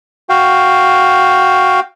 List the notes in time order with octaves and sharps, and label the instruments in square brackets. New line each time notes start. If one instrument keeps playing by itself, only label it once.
[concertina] F#4 F5 G5